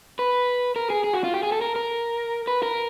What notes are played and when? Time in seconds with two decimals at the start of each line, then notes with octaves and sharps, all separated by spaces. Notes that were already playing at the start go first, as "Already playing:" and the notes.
0.19 B4
0.76 A#4
0.90 G#4
1.04 G#4
1.13 F#4
1.24 F4
1.34 G4
1.43 G#4
1.52 A4
1.61 A#4
1.76 A#4
2.47 B4
2.63 A#4